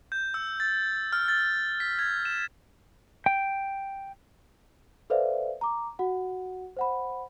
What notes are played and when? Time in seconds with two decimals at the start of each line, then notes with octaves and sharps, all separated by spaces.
0.12 G6
0.34 E6
0.60 A6
1.13 F6
1.28 A6
1.80 B6
1.99 G#6
2.25 E7
3.26 G5
5.10 A4 B4 C5 D5 E5 F5
5.61 A#5 D6
5.99 F#4 F#5
6.77 C5 F#5 B5